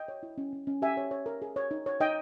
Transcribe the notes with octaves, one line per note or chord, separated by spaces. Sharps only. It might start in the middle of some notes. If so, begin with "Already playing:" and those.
Already playing: D#5 G5
C#5
E4
C#4
C#4
C#4
G4 E5 G#5
C#5
C#5
A#4
G#4
C#5
D#4
C#5
D#4 D#5 G5